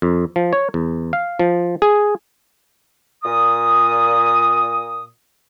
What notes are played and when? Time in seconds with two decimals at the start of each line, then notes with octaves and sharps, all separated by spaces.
0.02 F2
0.36 F3
0.53 C#5
0.74 E2
1.13 F5
1.39 F3
1.82 G#4
3.24 A#2 D#6